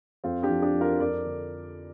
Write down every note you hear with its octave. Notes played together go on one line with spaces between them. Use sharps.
F2 C4 F4
D4 G4
F3
D4 G4
F2
F4 A#4
F2 A#4 D5
D3